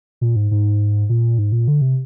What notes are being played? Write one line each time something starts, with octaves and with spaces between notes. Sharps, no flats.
A#2
G#2
G#2
A#2
G#2
A#2
D3
C3